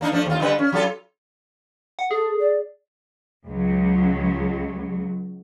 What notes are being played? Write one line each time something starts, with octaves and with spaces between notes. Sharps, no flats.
A#3 D4 D#4
F3 A3 D4
D#2 F4
D3 G3 B4
C#4
F#3 F4 A4
F#5
G#4 A4
D5
C#2 F#3